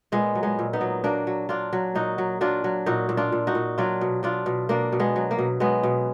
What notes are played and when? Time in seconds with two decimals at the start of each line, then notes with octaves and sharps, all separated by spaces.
0.12 A#2 G#3 B3
0.35 F#3
0.43 G#3 B3
0.59 A#2
0.73 B3 D#4
0.81 F#3
1.04 F#3 A#3 D4
1.27 F#3
1.49 F#3 D4 F4
1.73 F#3
1.95 A#2 D#4 F#4
2.18 F#3
2.41 F#3 D4 F4
2.64 F#3
2.86 A#2 D#4 F#4
3.09 A#2
3.17 D4 F4
3.32 A#2
3.47 D#4 F#4
3.55 A#2
3.78 F#3 D4 F4
4.01 B2
4.23 B2 D4 F4
4.46 B2
4.69 B2 A#3 D4
4.92 B2
5.00 G#3 B3
5.16 F#3
5.31 A#3
5.39 B2
5.60 F#3 G#3 B3
5.83 B2